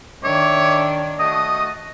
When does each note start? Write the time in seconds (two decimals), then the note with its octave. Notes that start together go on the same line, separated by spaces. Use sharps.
0.24 D#3 D4 C#5 E5 D6
1.19 A3 F#4 D#5 D#6